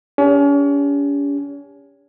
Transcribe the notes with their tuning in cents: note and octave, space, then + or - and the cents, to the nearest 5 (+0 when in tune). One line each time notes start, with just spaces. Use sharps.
C#4 +40 G4 +35